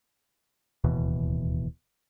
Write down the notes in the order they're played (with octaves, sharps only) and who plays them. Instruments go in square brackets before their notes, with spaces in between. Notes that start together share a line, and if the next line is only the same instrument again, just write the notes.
[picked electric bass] D1 D#2 B2 E3